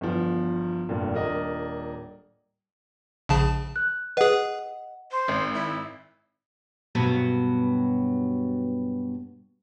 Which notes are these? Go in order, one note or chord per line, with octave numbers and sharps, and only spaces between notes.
G1 E2 F3
F1 G2 A#2
D#1 D4 A#4 D#5
A#1 C#3 A5
F#6
G#4 B4 D#5 F#5
C5
G#1
E4
G2 B2 F#3